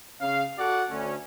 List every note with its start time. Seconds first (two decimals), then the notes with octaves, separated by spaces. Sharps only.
0.20 C#3 F5
0.58 F#4 A4 D5 F#5
0.90 D2 C#4